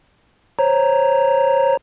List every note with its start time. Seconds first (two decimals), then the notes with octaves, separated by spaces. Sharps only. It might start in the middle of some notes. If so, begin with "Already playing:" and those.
0.59 C5 C#5 A#5